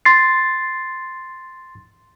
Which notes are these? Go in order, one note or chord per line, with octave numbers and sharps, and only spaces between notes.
C6 A6 C7